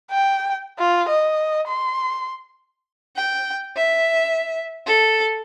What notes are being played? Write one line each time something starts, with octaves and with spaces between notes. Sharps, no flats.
G5
F4
D#5
C6
G5
E5
A4